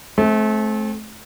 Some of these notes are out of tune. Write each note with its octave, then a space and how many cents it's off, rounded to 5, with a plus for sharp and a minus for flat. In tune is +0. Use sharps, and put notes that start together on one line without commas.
A3 -30 C4 +20